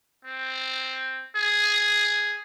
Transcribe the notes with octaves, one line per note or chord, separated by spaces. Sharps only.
C4
G#4